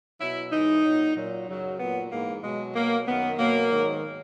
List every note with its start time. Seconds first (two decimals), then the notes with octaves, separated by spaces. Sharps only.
0.20 B2 F#3 E4
0.51 G#2 E3 D#4
0.84 A#2 F#3
1.15 A#2 F#3
1.47 F#2 C#3 F#3
1.79 A#2 F#3 B3
2.11 G#2 E3 A#3
2.43 B2 F#3 G#3
2.75 B2 F#3 A#3
3.07 F#2 D#3 F#3 B3
3.39 B2 F#3 A#3
3.70 G#2 D#3 F#3